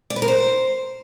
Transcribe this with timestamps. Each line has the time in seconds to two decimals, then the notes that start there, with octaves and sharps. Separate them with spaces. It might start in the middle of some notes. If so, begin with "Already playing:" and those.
0.10 D5
0.16 B4
0.22 A#4
0.28 C5